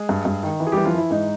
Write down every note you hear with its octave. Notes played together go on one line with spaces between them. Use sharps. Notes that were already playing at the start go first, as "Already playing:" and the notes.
Already playing: G#3 G#4
G2
G2
D#3
E3
G#4
E3 G3 G4
F3 F4
E3 E4
G#2 D#4